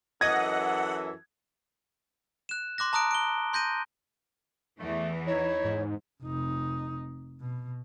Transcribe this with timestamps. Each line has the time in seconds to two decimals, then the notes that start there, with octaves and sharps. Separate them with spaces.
0.21 F#2 E3 A4 D#5 F#5 D#6 G#6 A#6
2.49 F#6 E7
2.78 C6 D6 F#6 A#6
2.93 A5 A#5 D#6 F#6 D7
3.11 D7 G7
3.53 C6 G6 A#6 D#7
4.80 E2 E3 A3
5.27 D#4 E4 C#5
5.65 G#2
6.23 F1 D#4
7.41 B2